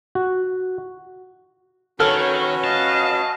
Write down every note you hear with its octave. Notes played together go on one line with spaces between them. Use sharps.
F#4
D#3 C#4 F#4 A4 B4 C#5 F6
D#5 F5 A5